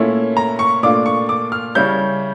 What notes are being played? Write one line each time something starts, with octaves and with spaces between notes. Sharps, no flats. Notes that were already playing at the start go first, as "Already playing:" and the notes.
Already playing: A#2 A3 C#4 E4
A#5
C#6
A#2 A3 D4 F4 D6
C#6
D6
F6
C#3 G3 C#4 E4 G6